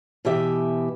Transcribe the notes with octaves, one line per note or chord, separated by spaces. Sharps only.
B2 E3 G4 E5